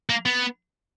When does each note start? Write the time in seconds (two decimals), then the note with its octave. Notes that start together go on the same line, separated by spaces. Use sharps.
0.10 A#3
0.26 B3